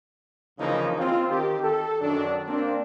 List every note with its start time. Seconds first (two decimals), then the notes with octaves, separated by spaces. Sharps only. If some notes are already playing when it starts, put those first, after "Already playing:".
0.59 D2 C#3 E3 F3 A#3 D#4
0.99 C4 F4
1.29 D#3 G4
1.63 A4
2.00 F#2 D#3 F#3 D4
2.47 A#3 C4 D4